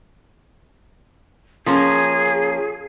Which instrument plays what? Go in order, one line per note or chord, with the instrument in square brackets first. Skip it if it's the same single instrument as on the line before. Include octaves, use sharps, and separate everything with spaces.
[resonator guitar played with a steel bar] F3 A#3 C#4 [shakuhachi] G#4